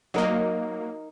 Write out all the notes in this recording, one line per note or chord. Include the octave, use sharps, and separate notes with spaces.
F#3 A#3 D#4 A#4 D#5